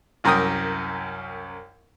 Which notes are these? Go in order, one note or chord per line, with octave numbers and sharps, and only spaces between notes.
C2 F#2 A#4 G5 D#6